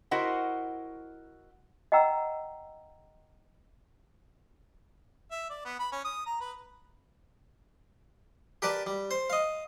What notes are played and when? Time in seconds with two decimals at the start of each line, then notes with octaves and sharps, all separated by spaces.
0.11 E4 F#4 A#4 C5 D#5 F#5
1.92 D#5 F#5 G5 A#5 E6
5.31 E5
5.50 D5
5.65 B3
5.79 B5
5.92 C#4
6.05 D#6
6.26 A#5
6.41 B4
8.62 G4 A#4 B4 D5 A5
8.87 G3
9.11 C5
9.30 D#5 F5